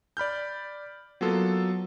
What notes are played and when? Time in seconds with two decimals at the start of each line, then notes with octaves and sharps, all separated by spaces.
0.17 D5 B5 F6 G6
1.21 F#3 A#3 B3 F4 A4